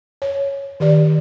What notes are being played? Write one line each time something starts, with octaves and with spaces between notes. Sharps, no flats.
C#5
D#3 G4 D5